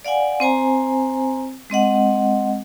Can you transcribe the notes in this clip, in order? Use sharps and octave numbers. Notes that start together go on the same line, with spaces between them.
D5 F5 F#5 G#5
C4 C5 G#5 A#5
G#3 C4 D#5 F#5